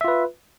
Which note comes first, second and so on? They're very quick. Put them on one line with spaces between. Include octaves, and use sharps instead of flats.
E5 F4 B4